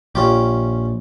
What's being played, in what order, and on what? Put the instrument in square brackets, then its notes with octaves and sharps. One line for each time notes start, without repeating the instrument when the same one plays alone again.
[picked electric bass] A#1 [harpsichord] C#4 F4 G4